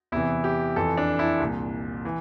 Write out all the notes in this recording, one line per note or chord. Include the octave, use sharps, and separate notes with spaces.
E2 C3 E3 E4
G4
F2 E3 A4
D4
E4
C2 A#2
E3